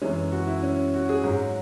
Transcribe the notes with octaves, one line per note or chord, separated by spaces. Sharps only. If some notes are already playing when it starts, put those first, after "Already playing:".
F#2 E3 G#3 C#4
F#4
E4
C#4
F#4
G#4
G#2 F#3